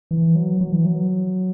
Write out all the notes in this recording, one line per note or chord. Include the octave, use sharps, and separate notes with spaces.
E3
F#3
F#3
E3
F#3